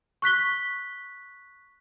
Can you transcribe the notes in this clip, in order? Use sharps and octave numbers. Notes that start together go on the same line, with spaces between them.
C#6 F#6 B6 G7